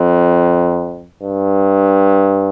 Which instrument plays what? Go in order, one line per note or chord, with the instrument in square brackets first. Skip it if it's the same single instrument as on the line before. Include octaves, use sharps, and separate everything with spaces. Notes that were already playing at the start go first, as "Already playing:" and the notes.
Already playing: [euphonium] F2
G2